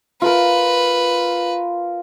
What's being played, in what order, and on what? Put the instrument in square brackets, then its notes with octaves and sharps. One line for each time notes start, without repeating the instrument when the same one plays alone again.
[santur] F4 A#4 [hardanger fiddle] B4